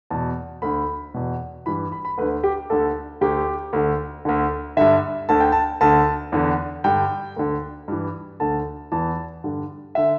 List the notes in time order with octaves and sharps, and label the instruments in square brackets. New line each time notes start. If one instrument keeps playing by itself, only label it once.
[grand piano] E2 B2 A5
D2 D3 B5
E2 B2
G2 E3 B5
B5
B5
D2 B4
D3
G4
D2 D3 A4
D2 D3 G4
D2 D3
D2 D3
G2 D3 E5
D2 D3 A5
G5
A5
D2 D3 A5
E2 D3
G2 D3 G5
D2 D3
G2 E3
D2 D3 A5
E2 E3 A5
G2 D3
D3 E5